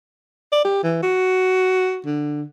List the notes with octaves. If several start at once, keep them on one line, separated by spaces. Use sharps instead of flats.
D5
G4
E3
F#4
D3